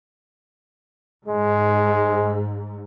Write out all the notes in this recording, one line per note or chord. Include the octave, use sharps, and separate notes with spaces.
G#2 G#3